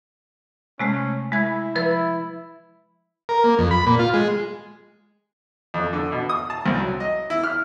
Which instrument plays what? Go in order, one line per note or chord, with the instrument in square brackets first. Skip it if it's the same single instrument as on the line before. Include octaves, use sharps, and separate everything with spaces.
[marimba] C3 G#3 A3 [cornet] C#4
[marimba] G#3 G#6 [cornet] E4
[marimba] F3 B4 A6 [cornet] E4
[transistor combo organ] A#4
A#3
F2
B5
A#2
F4
G#3
[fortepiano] F2
D3
B2
D#6
A5
C2
F#3
D#5
E4
F6